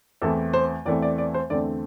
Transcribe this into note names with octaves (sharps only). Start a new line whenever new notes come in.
E2 E3 A3 C4 A4
C5
E2 E3 A3 C4 D5
D5
D5
C5
E2 D3 A3 C4 D5